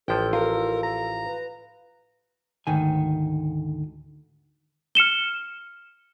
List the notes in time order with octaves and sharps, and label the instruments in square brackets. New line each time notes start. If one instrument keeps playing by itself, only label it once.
[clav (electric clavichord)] A1 F3 [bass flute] A4 [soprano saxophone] G5
[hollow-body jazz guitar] F4 [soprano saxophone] A#4
[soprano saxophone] A#5
[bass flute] B4
[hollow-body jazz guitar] D2 G#2 D#3 G#5
[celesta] F6 C#7 E7 G7